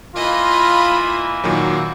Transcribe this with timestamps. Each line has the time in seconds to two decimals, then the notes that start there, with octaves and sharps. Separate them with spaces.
0.16 E3 A#3 F4 D#5 B5
1.44 A#2 D#3 F#3 F#4